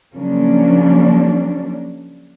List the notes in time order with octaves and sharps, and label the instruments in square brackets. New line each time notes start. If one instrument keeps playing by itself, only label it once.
[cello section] C#3 F3 F#3 A#3 C#4 D4